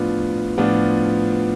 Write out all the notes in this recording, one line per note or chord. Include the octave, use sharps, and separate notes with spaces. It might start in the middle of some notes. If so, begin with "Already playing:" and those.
Already playing: A2 F3 B3 D4 F4
A2 F3 B3 D4 F4